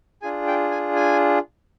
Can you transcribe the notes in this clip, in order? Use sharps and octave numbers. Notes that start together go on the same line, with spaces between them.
D4 F4 G#4 G#5
G5
G#5
G#5